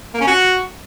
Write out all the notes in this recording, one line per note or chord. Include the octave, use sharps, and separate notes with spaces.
A#3
C#4
F#4